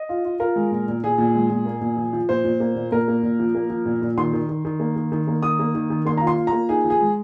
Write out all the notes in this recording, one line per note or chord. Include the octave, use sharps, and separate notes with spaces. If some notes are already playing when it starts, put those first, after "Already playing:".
Already playing: D#5
F4
F4
F4 A#4
G#3
A#2
A#2
A#2 G#4
A#2
G#3
A#2
A#3
A#2
F3
F3
A#2 C5
A#2
A#3
A#2
A#2 A#4
A#3
A#2
F3
A#3
F3
A#2
A#2
D#3 C6
D#3
D#3
D#3
A#3
D#3
D#3
A#3
D#3 D#6
A#3
D#3
D#3
A#3 C6
F4 A#5
C6
F4
A#5
A#3
D#4 G#4
F3
G#4
G#3